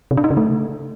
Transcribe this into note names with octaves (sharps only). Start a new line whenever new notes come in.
C3
D4
D#4
C#3
A3